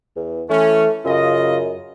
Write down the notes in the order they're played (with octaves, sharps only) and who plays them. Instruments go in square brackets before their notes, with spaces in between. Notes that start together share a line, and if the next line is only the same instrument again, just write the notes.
[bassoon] E2
[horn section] E3 C#4 [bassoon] A3
[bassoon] F#2 [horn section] C#3 F4 D#5